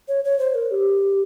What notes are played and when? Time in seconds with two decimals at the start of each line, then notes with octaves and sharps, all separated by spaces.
0.08 C#5
0.24 C#5
0.39 C5
0.55 A#4
0.71 G4